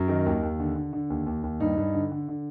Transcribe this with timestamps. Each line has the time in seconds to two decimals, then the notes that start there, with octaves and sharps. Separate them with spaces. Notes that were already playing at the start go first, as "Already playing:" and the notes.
Already playing: F#2
0.08 D#3
0.26 D#2
0.43 D#2
0.60 D3
0.76 D3
0.93 D3
1.10 D#2
1.26 D#2
1.43 D#2
1.60 G2 D#4
1.78 G2
1.94 D3
2.12 D3
2.28 D3